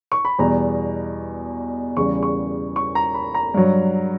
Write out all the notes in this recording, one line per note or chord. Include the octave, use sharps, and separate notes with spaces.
C#6
B5
E2 B2 G3 A#5
E2 C#3 G3 C#6
C#6
C#6
A#5
B5
A#5
G2 F#3